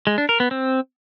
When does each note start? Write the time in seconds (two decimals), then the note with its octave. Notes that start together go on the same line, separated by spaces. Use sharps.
0.07 G#3
0.18 D4
0.29 A#4
0.40 B3
0.51 C4